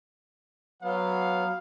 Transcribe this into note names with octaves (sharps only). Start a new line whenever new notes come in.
F#3 B3 F5